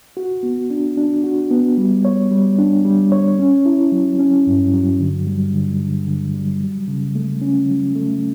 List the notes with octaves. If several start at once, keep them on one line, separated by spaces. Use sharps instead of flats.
F#4
B3
D4
D4
F#4
B3
G3
C#5
G3
D4
G3
C#5
C#4
E4
F#3
C#4
G2
F#3
D3
G3
D3
D3
D3
G3
F#3
C#3
A3
C#4
F#3
A3